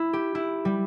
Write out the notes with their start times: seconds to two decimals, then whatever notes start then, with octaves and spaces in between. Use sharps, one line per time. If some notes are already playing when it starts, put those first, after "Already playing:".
Already playing: E4
0.13 G4
0.35 E4
0.65 G3